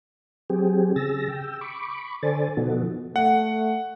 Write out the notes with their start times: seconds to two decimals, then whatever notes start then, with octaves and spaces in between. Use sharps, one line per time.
0.50 F#3 C4 G4 G#4
0.96 C#3 G#4 E6 A6 A#6
1.28 G5 E6
1.61 B5 C#6 D6
2.23 D3 A4 C5 D5 G#5 A6
2.57 B2 F3 B3 D#4 F#4 A4
3.16 A3 F#5